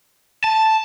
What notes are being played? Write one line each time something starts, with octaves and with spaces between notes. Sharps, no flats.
A5